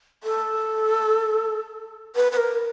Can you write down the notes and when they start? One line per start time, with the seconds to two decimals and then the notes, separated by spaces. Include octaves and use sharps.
0.23 A4
2.16 B4
2.32 B4
2.37 A#4